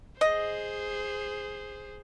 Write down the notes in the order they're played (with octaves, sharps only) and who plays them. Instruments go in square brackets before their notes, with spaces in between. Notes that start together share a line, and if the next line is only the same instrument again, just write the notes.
[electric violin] G#4 C5 [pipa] D#5